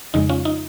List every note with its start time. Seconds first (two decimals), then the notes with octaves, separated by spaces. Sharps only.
0.14 F2 C#3 F3 G#3 D#4
0.29 C#4 F4
0.45 D#4